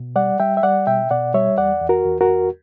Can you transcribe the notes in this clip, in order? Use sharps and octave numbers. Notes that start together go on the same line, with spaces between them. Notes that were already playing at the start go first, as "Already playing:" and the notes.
Already playing: B2
G3 D5 F#5
G3 E5 G5
E5
G3 D5 F#5
B2 E5 G5
B2 D5 F#5
G3 C#5 E5
E2 D5 F#5
E2
F#4 A#4
E2
F#4 A#4
E2